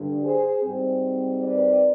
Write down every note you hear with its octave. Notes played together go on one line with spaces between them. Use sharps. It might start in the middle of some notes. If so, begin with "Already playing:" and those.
Already playing: G2 D3 G3
G#4 C5
G#2 G3 C4
B4 D5